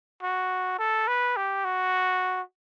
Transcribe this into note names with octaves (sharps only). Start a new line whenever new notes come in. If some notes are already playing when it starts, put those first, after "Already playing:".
F#4
A4
B4
G4
F#4